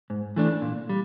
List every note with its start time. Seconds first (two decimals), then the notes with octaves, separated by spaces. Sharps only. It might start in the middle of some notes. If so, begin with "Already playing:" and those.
0.10 G#2
0.36 E3 A3 D4
0.62 A#2
0.89 G3